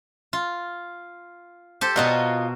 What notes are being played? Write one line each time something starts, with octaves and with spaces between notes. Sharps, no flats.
F4
G4 A4 C5
B2 F4 F#4 A#4 D#5